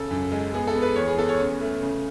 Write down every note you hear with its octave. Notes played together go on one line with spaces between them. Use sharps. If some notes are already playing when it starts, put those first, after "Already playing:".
Already playing: C#3 A4
F#2
G#3
B3 G#4
A4
B3
B4
E2 C#5
G#4
B3 A4
C#5
C#4
A3
C#3